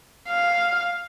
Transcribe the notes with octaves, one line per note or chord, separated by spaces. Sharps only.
F5